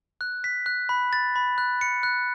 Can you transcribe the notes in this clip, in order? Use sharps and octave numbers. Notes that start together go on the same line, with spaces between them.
F#6
B6
F#6
B5
A6
B5
F#6
C#7
F#6